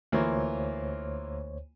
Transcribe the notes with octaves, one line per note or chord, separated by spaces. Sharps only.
D2 E3 A#3 F4 C5 C#5